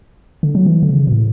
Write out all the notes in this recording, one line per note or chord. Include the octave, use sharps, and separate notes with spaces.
D3
F#3
E3
D3
C#3
B2
A2